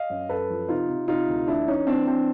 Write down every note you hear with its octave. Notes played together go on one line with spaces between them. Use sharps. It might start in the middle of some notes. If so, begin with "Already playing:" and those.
Already playing: D#5 F5
F#2
F#2 A4 B4
F3
C3 D#4 F4
C3
C3 D#4 F4
D2
E3 D4 E4
E3 C#4 D#4
E3 C4 D4
E3 C4 D4